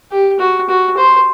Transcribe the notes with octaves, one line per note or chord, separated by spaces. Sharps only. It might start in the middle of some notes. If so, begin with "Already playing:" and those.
G4
F#4
F#4
C5